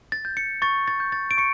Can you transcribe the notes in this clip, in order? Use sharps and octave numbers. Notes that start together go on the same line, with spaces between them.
A6
G6
C#7
C#6 A6
A6
G6
A6
D7
C#6 C#7